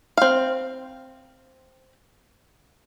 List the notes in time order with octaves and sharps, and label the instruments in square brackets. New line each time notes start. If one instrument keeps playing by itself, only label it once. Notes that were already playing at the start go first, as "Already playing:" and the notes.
[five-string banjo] C4 F5